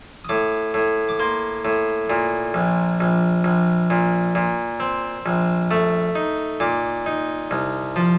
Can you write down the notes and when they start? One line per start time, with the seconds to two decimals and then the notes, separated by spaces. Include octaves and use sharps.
0.25 D#6
0.29 A2 D6
0.74 A2
1.09 D6
1.19 A#3 C6
1.65 A2
2.10 A#2 A#5
2.54 A#1
3.00 A#1
3.44 A#1
3.90 A#2
4.35 A#2
4.80 C4
5.26 A#1
5.71 A3 D#6
6.15 D#4
6.60 A#2 D6
7.06 D#4
7.51 C2
7.96 F3